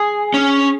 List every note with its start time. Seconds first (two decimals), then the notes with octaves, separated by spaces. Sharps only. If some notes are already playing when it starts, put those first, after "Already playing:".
Already playing: G#4
0.34 C#4